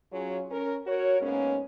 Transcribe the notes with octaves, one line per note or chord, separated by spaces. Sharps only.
F#3 C#4 F4 G#4 C#5
C#4 A#4
F#4 A#4 C#5
G#2 A#3 B3 C#4